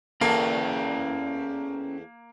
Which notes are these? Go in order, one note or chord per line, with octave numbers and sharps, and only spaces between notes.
E2 A#3 C#4 A4 A#4 G5